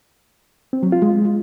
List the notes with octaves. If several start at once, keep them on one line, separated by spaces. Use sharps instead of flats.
C4
F#3
F4
G#3